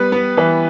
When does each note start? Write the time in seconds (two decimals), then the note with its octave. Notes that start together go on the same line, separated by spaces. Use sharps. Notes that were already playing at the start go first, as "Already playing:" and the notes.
Already playing: G3 B3 B4
0.12 B3
0.37 E3 B4